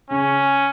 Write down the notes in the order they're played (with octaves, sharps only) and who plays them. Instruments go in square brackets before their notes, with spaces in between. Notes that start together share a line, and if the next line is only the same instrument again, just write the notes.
[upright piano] C#3 [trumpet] C#4